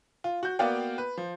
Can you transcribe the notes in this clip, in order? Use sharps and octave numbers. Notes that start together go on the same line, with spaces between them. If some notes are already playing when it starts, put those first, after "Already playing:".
F4
F#4 G6
A#3 B3 F#4 D5 F5 G5
B4
F3